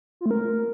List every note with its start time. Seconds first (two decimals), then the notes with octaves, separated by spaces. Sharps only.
0.21 F4
0.26 A3
0.31 A#4